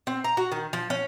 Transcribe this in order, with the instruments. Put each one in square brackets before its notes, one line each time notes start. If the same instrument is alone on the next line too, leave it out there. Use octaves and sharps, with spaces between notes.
[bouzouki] C4
A#5
F#4
D#3
F3
C#4